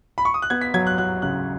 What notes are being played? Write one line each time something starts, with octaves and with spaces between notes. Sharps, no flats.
B5
C#6
D#6
F#6
B3 G#6
B6
F#3 G#6
F#6
F#3 F#6
C#3 F#6